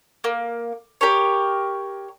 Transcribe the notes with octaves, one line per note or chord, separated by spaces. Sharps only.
A#3
G4 A#4 C#5